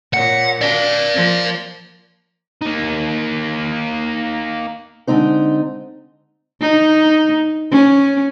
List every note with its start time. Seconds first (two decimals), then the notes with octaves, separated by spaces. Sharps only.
0.13 A#2 C#5 F#5
0.61 D4 D5 F5
1.14 F3 A#3
2.61 A#3 D#4
5.07 D3 G#3 C4 D#4 C5
6.61 D#4
7.72 C#4